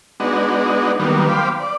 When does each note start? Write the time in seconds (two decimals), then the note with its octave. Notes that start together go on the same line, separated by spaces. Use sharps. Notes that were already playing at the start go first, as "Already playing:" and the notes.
0.20 G#3 B3 D4 D#4 F#4
1.00 D#3 F#3 G3 A#3 B3
1.29 C5 F5 G5 B5 D6
1.60 D5